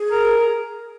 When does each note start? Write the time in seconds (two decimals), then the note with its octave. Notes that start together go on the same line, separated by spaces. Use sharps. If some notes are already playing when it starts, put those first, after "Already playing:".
Already playing: G#4
0.11 A#4